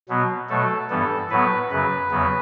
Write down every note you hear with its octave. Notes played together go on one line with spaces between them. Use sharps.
B2 F#3 B3
B2 F#3 A3 A4
G2 E3 G3 B3 A4
A2 F#3 B3 B4
F#2 C#3 F#3 B4
E2 C#3 F#3 B3